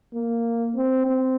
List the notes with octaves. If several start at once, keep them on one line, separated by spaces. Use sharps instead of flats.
A#3
C4
C4